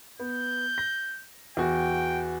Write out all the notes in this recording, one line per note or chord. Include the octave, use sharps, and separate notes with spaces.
B3 G6
A#6
E2 F#4 G5